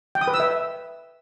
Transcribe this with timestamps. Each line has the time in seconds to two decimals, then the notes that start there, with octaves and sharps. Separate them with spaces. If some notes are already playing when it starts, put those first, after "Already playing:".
0.15 G5
0.21 D#6
0.28 B4
0.34 E6
0.40 E5